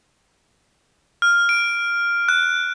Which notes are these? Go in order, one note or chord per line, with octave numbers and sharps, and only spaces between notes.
F6
D7
F#6